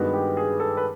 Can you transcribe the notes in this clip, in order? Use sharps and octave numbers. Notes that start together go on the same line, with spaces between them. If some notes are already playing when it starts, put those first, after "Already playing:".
Already playing: G2 D#3 G#3 B3 F#4
G4
G#4
A4
B4